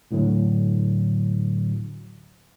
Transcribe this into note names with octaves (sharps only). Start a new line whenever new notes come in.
D2 A2 D3 F#3